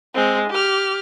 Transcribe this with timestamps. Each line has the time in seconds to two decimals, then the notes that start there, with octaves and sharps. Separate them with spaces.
0.15 G#3 C4
0.50 G4 F6